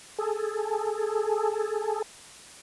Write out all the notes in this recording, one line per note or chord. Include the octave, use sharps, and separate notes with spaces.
G#4 A4